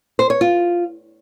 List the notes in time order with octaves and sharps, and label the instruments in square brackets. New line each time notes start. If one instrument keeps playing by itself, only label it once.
[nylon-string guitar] C5
C#5
F4